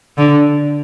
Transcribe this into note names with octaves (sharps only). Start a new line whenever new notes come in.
D3